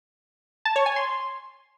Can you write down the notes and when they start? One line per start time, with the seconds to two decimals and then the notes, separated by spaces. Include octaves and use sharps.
0.65 A5
0.76 C#5
0.86 G#5
0.96 C6